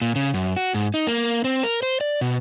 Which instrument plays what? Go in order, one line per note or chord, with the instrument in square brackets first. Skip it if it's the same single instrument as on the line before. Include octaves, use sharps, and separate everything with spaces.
[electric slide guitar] A#2
C#3
F#2
F#4
G#2
D#4
A#3
C4
A#4
C5
D5
B2